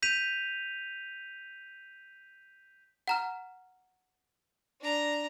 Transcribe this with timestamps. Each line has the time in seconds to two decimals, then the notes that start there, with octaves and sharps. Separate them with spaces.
0.02 G6 B6 D#7 F7
3.08 F#5 A#5 F6
4.80 D4 A#5